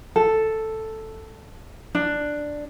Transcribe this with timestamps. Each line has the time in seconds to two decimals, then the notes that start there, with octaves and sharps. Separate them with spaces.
0.16 A4
1.95 D4